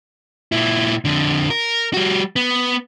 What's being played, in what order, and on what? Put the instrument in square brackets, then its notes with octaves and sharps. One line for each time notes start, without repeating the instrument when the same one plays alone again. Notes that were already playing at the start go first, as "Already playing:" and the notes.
[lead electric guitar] A#2 E4
F2 D3
A#4
G3 F#4
B3